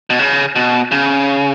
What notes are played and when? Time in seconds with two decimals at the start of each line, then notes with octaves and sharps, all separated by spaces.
0.10 B2
0.19 C#3
0.56 B2
0.92 C#3